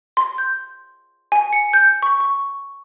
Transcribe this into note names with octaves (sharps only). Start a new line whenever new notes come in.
C6
G6
G#5
C#7
G6
C#6
C#6